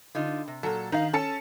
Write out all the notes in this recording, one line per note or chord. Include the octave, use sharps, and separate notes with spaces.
D3 D#4 F4
C3
A#2 F#3 A4
D#3 D#4 D#5 F5
C#4 A4 A5 C#7